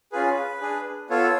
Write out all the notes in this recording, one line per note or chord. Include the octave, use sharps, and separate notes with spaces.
C#4 F4 G#4 B4
D4 G#4
B3 F4 A4 C#5